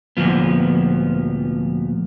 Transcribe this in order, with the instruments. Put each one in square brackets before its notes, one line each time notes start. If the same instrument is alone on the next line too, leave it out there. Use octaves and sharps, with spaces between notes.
[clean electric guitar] D2 G2 A#2 F3 B3